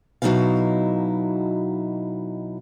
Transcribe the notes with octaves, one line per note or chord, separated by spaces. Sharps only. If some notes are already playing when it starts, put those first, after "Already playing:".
B2 F#3 C#4 D#4 E4 F5